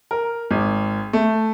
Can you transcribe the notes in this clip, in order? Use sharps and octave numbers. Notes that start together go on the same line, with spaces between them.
A#4
G#1
A3